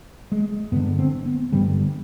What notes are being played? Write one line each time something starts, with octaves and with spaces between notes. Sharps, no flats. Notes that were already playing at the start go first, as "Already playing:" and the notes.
G#3
G2 D3 B3
C4
B3
G2 D3 G3